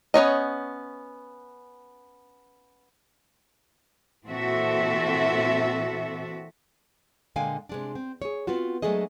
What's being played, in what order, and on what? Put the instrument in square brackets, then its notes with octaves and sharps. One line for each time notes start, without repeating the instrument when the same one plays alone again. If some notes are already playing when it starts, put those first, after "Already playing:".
[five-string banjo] B3 C#4 C#5 D#5
[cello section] A#2 E3 C4 F#4 A4 E5
[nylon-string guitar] A#2 D3 G#3 F5 G5 G#5
C3 G#3 D4
C4
G#4 C#5
B3 C4 F4 F#4
F#3 G#3 A3 D4 G#4 D#5